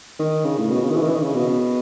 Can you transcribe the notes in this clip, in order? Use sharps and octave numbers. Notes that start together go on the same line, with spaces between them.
D#3
C#3
A2
B2
C#3
D#3
E3
D#3
E3
D#3
C#3
B2